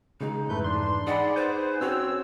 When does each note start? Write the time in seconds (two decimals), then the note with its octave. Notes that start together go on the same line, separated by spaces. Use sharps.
0.21 C#3 G#3 D#4
0.49 F2 G#2 E3 A3 B4 G6
0.64 D4 C6
1.07 D#4 G#4 D5 F#5 B5
1.36 B4 C5
1.81 C4 C#4 F#4 C#5 E6